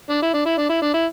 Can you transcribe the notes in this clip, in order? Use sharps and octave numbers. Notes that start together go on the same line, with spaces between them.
D4
E4
D4
E4
D4
E4
D4
E4